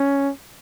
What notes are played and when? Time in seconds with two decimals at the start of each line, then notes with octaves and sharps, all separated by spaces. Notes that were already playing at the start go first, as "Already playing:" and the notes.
Already playing: C#4